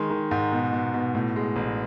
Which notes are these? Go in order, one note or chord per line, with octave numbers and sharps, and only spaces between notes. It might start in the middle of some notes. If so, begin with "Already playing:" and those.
Already playing: D#3 G#3
D#3
G#2
B2
B2
B2
A2
G#3
A1